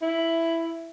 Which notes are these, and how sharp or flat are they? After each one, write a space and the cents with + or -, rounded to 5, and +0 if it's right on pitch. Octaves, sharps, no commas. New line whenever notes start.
E4 +5